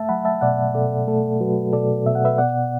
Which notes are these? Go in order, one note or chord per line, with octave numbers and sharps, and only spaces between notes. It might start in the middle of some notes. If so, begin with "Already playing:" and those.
Already playing: A3 E5 A5
F#3 F#5 B5
E5 A5
B2 D5 F#5
B2 A4 D5
A3 A4
F#3 F#4 B4
B2 A4 D5
B2 E5
F#5
B4 E5
B3 D5 F#5